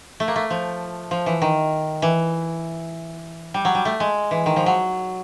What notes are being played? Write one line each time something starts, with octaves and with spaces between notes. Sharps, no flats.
A3
A#3
A3
F3
F3
E3
D#3
E3
G3
F#3
G3
A3
G#3
E3
D#3
F3
F#3